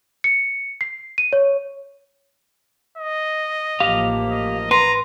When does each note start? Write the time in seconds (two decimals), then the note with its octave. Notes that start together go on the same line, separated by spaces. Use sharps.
0.24 C#7
0.81 C7
1.18 D#7
1.33 C#5
2.98 D#5
3.80 A1 F3 A#3 G4 F5
4.30 D#5
4.71 B4 A#5 C6